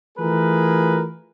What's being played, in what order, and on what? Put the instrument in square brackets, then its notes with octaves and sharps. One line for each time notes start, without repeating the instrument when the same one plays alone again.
[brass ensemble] E3 A3 F4 G#4 A#4 B4